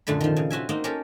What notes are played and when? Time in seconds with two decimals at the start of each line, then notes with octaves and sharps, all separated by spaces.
0.07 F#2 A#2 D3 A3 B5
0.21 D#3 F3
0.37 C#3
0.50 C4 F#4 E5 G#5
0.69 A#3 C4 D#4
0.84 C#4 G4 A4 A#4